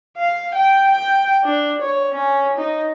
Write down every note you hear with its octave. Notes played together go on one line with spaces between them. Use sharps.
F5
G5
G5
D4
C#5
C#4
D#4